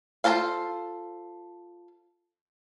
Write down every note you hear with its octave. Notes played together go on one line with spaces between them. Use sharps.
F4 F#4 A4 C5 F5